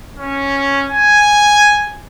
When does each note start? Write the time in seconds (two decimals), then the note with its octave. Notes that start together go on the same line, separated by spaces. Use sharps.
0.17 C#4
0.90 G#5